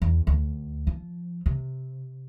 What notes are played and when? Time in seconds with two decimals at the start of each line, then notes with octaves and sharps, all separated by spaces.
0.02 E2
0.27 D2
0.87 F3
1.46 C3